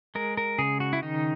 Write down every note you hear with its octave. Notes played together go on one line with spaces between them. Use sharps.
G#3 A#4
A#4
C#3 G#4
F#4
E4
D#3 D#4